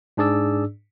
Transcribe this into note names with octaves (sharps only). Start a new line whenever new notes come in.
G#2 D4 G#4 D5 E6